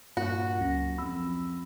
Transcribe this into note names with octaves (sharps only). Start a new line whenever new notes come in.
G2 A#2 F#4
C#2 F#2 A#6
F2 B5 E6